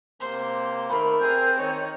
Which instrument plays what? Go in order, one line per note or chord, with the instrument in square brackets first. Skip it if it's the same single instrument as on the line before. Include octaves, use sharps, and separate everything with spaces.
[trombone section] C3 A#3 [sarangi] C5
[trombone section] D#3 A3 [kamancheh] A#4 [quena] B5
[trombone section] C4 [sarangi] G#4 [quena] G6
[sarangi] D#3 [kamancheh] C#5